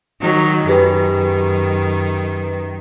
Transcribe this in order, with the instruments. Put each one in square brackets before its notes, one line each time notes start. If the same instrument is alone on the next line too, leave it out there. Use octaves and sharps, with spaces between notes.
[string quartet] D#3 F#3
[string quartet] F#2 D#3 [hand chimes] G4 G#4 B4